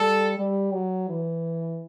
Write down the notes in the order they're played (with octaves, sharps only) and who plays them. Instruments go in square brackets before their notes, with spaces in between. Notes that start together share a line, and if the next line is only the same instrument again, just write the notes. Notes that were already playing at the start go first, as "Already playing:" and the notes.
Already playing: [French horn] G3 [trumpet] A4
[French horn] G3
F#3
E3